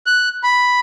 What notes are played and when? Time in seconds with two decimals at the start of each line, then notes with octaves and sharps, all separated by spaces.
0.06 F#6
0.43 B5